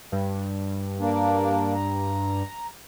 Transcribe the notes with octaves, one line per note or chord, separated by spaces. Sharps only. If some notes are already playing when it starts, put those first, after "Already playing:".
G2
A#3 D4
A#5